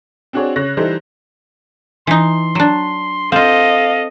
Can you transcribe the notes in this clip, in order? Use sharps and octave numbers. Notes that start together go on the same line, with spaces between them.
C4 D4 F#4 G#4 C#5 D5
C#3 C#5 F#6 A#6
E3 G3 D#4 A4 C5
E3 D#4 C6
F#3 D4
C4 F4 A4 D#5 F5